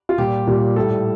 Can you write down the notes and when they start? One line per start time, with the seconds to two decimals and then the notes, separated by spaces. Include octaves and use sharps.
0.09 F4
0.18 A#2 G3 G4
0.47 A#2 G3
0.76 A2 G3 A4